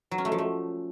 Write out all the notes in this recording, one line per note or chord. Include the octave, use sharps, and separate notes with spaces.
F#3
C#4
A3
F3
A3